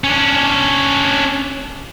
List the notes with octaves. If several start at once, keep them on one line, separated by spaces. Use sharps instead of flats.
C#4 D4